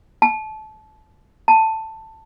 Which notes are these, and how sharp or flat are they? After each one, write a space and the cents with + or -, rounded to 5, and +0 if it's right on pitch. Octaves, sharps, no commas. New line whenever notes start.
A5 -25
A5 +10